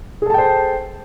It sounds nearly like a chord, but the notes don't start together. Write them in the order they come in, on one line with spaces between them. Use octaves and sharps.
G#4 A4 A5 G5 C5